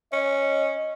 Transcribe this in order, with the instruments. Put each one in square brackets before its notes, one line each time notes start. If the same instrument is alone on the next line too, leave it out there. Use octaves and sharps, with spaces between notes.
[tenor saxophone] C#4 [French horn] D#5